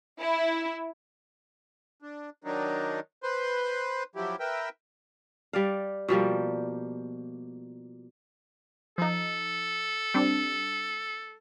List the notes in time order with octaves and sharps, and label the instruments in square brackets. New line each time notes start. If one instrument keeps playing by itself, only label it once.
[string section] E4
[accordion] D4
D#3 F#3 D4 D#4
B4 C5 C6
F3 F#3 E4 G4
A#4 B4 E5 G5
[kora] G3 D5 F5
B2 F3 G3 A#3
[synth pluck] F3 D#4 [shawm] A4
[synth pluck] G3 C4 D4